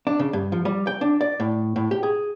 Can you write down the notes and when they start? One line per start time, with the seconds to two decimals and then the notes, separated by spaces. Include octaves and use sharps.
0.07 D4
0.19 C#3
0.33 G2
0.52 F3
0.65 G3
0.87 G5
1.01 D4
1.21 D5
1.40 A2
1.76 A2
1.91 G4
2.03 G#4